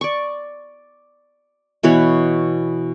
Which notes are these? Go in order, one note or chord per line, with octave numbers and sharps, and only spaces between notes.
D5 C#6
B2 E3 B4 C#5